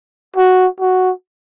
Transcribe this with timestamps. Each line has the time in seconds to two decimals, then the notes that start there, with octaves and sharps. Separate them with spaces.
0.36 F#4
0.80 F#4